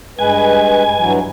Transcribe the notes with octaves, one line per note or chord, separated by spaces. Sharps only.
G2 G#3 B4 G#5
G2 E3 F#3